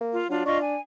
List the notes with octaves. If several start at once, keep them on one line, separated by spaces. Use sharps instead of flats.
A#3
F4
F#3 D4 F4
D4 F4 D#5 C#6
G#5